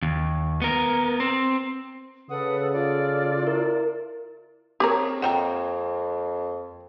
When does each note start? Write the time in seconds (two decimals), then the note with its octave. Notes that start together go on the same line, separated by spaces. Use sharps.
0.02 D#2
0.62 B3 A#4
1.20 C4
2.30 C#3 A4 B4 F#5 D#6
2.73 F4 A4 D5
3.43 E4 A#4
4.80 A#3 C4 G4 G#4 A#4 C#5
5.22 F2 F#5 G5 A#5